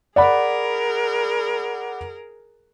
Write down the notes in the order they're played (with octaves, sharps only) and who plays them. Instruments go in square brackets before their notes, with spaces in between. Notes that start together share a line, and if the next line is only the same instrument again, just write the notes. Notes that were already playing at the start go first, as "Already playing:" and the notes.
[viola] G#4 A#4 [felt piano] D5 F#5 B5